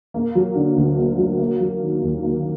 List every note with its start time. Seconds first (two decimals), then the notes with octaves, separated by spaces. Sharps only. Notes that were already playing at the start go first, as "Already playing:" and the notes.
0.14 A#3
0.35 F#3
0.55 D3
0.76 D2
0.97 A#3
1.18 F#3
1.39 A#3
1.60 F#3
1.82 D#3
2.02 D#2
2.23 A#3